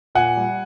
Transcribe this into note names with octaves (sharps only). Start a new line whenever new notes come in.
A#2 F#5 G#5
G3